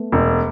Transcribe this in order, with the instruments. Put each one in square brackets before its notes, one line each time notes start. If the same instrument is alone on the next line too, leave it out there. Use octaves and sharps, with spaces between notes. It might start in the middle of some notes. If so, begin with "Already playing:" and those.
Already playing: [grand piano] A3 B3
[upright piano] E1